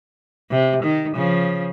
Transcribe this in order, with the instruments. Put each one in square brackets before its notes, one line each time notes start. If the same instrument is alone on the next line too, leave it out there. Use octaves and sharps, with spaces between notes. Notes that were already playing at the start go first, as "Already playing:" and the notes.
[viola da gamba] C3
D#3
C#3 F3